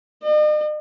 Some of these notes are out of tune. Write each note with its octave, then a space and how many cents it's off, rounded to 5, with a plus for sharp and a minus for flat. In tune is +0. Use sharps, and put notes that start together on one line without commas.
D#5 -45